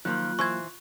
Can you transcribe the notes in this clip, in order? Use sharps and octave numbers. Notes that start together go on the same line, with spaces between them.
D#3 F3 F#3 A#3 F4 F#6
E3 C5 C#6 G#6